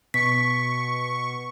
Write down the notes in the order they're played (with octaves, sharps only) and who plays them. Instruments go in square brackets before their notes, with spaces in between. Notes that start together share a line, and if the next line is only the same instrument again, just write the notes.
[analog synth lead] B2 [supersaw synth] C#6 [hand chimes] B6